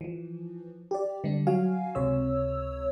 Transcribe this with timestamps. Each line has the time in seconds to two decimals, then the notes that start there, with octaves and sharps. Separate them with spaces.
0.01 E3 F3
0.91 G4 D5
1.24 D3 G3 D4
1.47 F#3 F#4 F5 G#5
1.95 C#2 C3 C#5 E6